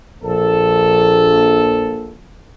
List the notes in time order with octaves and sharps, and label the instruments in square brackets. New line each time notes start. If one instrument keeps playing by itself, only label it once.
[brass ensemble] A#1 A4